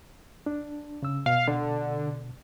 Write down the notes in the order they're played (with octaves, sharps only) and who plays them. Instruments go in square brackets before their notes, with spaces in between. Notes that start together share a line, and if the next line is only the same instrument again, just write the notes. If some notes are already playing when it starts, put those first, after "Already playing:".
[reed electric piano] D4
C#3 E6
[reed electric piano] B2 [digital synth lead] F5
[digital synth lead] D3